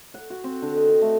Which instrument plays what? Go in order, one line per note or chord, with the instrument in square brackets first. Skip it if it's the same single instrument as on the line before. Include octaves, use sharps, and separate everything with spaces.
[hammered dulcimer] F#5
F#4
C4
D3
D#5
D#3
A3